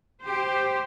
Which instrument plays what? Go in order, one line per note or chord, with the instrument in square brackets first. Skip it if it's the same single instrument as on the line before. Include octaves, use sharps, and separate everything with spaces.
[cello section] G4 C5